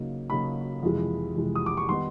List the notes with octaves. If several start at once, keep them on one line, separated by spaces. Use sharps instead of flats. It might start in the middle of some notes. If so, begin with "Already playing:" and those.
Already playing: C#3 F#3 A#3 D#4
C#3 F#3 A#3 D#4 B5
F2 C3 E3 G#3
F2 C3 E3 G#3
D#6
D6
C#6
D#3 G3 B3 D#4 C6